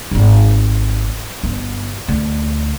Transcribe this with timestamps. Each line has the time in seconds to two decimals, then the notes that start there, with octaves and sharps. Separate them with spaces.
0.11 D#1 G#1
1.43 G1
2.08 D2